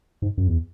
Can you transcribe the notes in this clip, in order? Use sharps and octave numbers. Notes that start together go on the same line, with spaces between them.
G#2
F#2
E2